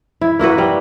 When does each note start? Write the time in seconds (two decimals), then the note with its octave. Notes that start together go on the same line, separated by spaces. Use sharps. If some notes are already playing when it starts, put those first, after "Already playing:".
0.21 E4
0.39 A#3 E4 F#4 B4
0.58 G3